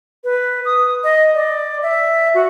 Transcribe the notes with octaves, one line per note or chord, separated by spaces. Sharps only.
B4
D#6
D#5
D5
E5
F#4